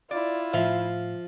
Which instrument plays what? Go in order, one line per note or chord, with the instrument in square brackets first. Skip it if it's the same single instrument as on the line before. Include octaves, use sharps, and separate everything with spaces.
[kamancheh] E4 F4 [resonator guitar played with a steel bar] D5
[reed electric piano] A2 [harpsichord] F3 [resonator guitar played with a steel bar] E5 F5